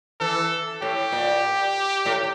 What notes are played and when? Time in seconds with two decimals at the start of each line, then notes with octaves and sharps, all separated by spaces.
0.20 E3 A4
0.82 A2 G4
1.12 A#2
2.06 A2